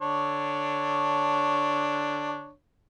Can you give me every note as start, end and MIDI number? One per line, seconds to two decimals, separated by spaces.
0.02 2.51 50
0.02 2.51 62
0.02 2.51 73